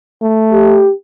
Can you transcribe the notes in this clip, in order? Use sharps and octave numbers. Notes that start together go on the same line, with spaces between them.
A3
G4